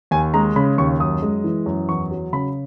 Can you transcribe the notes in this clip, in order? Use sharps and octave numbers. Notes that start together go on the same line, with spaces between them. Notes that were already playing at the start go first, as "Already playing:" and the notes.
D#2 G#5
G#3 A#5
C#3 B5
D#2 C#6
F#2 D#6
G#3
E3
F#2
E2 C#6
F#3
C#3 B5